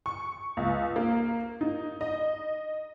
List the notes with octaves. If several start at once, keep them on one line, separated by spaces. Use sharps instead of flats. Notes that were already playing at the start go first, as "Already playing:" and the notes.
C#6
C#2
A#3
D#4
D#5